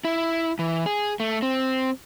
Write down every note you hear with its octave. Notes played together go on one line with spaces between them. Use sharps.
E4
E3
G#4
A3
C4